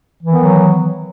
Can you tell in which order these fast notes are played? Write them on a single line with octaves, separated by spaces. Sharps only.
E3 D#3 B3 F#3